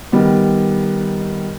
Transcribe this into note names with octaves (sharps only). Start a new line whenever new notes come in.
D#3 G3 B3